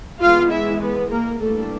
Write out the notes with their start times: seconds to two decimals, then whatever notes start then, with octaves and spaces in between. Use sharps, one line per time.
0.20 E3 G#3 B3 F4 F5
0.50 E4 E5
0.80 B3 B4
1.10 A#3 A#4
1.40 E3 G3 A3 A#3 D4 A4